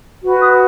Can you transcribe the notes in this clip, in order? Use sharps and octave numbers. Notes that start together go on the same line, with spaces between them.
F#4 B4
D#6